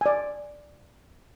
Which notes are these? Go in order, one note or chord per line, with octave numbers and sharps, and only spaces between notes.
D5 G#5